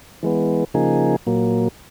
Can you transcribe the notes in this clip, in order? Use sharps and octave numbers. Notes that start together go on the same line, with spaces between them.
E3 G#3 B3
C#3 F3 A#3 D#4 G#4
A#2 F#3 A#3